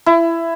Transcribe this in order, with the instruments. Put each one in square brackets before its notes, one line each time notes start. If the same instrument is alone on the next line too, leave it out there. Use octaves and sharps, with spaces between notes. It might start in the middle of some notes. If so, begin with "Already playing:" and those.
[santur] E4